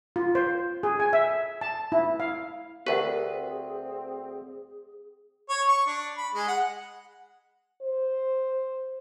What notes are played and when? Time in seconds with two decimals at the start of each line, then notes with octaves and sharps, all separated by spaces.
0.16 F4
0.35 C5
0.83 G#4
1.00 G#5
1.13 E5
1.61 A5
1.92 E4
2.20 F5
2.87 D2 C4 G4 G#4 A#4 B4 F#5
5.49 C#5
5.68 C#6
5.86 D4
6.17 B5
6.34 G#3
6.48 F#5
7.82 C5